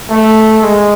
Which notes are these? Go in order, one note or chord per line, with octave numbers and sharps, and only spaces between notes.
A3
G#3